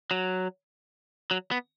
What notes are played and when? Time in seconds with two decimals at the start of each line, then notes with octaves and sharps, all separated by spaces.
0.11 F#3
1.31 F#3
1.51 B3